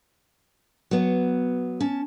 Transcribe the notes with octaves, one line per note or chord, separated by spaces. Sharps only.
F#3 B3
C#4 A5